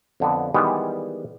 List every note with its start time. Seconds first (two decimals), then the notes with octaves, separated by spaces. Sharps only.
0.20 F2 D3 B3
0.54 D#3 E3 G3 G#3 B3 D#4